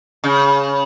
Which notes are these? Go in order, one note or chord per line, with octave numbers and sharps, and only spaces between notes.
C#3